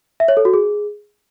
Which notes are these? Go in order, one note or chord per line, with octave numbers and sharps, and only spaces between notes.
E5
C#5
A4
F#4
G#4